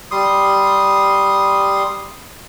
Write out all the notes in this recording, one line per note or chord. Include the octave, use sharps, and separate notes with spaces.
G3 C6 D#6